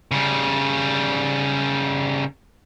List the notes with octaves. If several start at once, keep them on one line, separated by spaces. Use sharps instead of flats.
C#3 G3